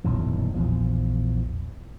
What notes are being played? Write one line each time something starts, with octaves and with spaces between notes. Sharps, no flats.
D#1 B1 F#2 E3
A#1 E2 F3